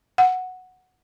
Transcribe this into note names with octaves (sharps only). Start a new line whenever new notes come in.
F#5